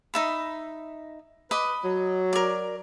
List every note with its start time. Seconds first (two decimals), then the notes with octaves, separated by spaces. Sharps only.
0.14 D#4 E5 B5
1.51 B4 D#5 B5 D6
1.84 F#3
2.33 A#4 D5